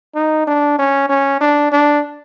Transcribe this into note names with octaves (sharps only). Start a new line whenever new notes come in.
D#4
D4
C#4
C#4
D4
D4